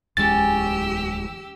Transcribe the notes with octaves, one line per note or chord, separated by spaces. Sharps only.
D1 E2 G#3 C#4 G4 E6 A6